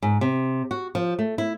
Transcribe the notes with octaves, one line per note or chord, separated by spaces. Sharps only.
G#2
C3
F#4
F3
A3
E4